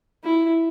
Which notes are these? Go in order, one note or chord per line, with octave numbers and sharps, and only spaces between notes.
E4